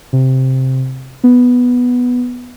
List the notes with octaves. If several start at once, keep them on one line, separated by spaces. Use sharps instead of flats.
C3
B3